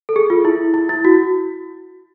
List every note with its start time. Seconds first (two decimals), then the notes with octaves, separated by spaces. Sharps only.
0.09 A4
0.16 G#4
0.30 F4
0.45 E4
0.74 E4
0.89 E4
1.05 F#4